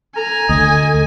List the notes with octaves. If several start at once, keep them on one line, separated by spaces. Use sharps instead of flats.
A4 G#5 A#5
D2 D#5